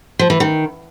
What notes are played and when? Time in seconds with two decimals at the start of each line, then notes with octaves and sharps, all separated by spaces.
0.19 F3
0.30 E3
0.40 D#3